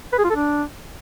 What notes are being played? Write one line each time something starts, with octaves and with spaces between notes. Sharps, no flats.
B4
G#4
F4
A4
D4